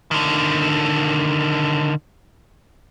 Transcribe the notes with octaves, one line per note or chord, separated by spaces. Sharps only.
D3 D#3